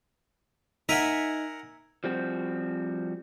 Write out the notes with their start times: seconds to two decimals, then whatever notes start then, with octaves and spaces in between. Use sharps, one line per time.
0.89 D#4 A#4 E5 F#5 G#5
2.04 F3 G3 C4 F#4